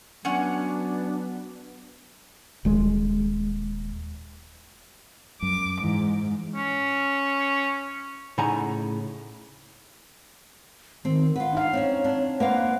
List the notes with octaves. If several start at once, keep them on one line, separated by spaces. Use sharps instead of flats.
F#3 B3 C#4 D4 F#5
D#1 G#3
F#2 D6
G#2 E3
C#4
A2 C#3 D#4 F#5 G#5 A#5
D#3 C4
F4 B4 F#5
D4 D#4 F5
C4 C#4 C#5
C4 D4
A#3 B4 C5 F5 F#5